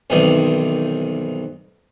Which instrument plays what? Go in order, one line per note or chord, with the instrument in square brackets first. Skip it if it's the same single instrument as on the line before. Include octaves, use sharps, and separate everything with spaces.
[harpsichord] B1 G2 C3 D#3 E3